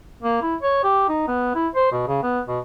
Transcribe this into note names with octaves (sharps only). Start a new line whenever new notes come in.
A#3
E4
C#5
G4
D#4
B3
E4
C5
B2
C#3
B3
B2